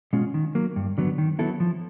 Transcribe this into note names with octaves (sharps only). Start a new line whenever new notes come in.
B2 G#3 C#4 F4
D#3
F#3 A#3
G2
D3 F#3 B3
D#3
F#3 B3 E4 A4
F3